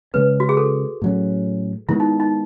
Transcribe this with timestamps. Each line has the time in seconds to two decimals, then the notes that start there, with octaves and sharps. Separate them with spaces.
0.14 C#3 G#3 C#4 B4
0.40 F#4
0.49 G#4
0.57 A4
1.02 A2 F#3 C#4
1.89 D#3 G#3 B3 E4
2.00 D#4
2.20 D#4